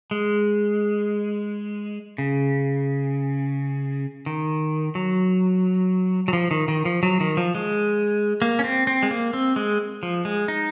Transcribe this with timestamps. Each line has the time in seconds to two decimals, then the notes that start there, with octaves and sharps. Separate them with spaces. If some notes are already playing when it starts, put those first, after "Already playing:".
0.11 G#3
2.18 C#3
4.26 D#3
4.95 F#3
6.28 F#3
6.33 F3
6.51 D#3
6.68 D#3
6.85 F3
7.03 F#3
7.20 D#3
7.37 F3
7.55 G#3
8.42 A#3
8.59 C#4
8.64 C4
8.87 C4
9.03 G#3
9.11 A#3
9.33 C4
9.56 G#3
10.03 F3
10.25 G#3
10.48 D#4